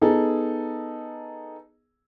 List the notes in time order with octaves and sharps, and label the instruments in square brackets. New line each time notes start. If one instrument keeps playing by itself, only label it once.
[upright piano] B3 D#4 G#4 A4